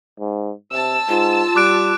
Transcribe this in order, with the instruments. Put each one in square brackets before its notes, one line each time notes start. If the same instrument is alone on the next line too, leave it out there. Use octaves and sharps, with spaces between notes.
[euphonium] G#2
[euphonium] C3 [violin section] A5 E6
[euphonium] G#2 [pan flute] F4
[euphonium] G3 [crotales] D6 F#6 D7